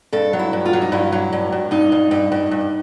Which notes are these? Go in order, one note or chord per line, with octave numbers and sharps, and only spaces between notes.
G2 A4
F#3
E4
G2
F4
F#3
D#4
G2 E4
F#3
G2
G2
G2 D#4
G2
G2
G2
G2